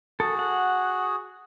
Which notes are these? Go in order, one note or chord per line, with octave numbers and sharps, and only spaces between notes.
F#4 G#4 A4
F#5